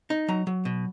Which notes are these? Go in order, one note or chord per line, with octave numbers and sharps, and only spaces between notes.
D#4
F#3 A#5
F#3
B2